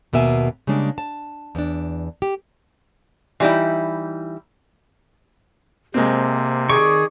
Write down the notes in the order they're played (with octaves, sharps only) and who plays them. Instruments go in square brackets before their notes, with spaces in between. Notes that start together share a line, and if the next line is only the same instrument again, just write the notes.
[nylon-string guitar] D#2 B2 A#3 E5 G#5
C#3 G3 G#3 A#3 D4
A5
E2 D4
G4
[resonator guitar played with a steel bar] E3 G3 A#3 D#4 E4
[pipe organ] C3 [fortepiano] G#3 C4 [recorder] A#3
[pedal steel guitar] D#3 D5 C#6 [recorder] G#4